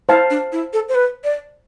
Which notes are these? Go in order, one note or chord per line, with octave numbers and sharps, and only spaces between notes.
E4 C5 F5 A5
D4
E4
A4
C5
B4
D5